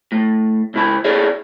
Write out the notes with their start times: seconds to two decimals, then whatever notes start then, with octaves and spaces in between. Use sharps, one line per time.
0.12 A2
0.74 C#2 E4 B5
1.05 E4 G#4 C#5 D5